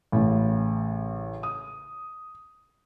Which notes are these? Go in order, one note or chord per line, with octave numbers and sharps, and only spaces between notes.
A1 A2 C#3
D#6